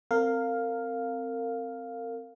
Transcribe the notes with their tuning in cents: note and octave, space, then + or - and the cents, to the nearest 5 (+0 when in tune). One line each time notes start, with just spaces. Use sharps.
C4 +0 A#4 -30 F5 +5